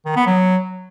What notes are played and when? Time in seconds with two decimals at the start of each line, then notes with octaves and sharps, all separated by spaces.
0.05 D#3
0.16 B3
0.26 F#3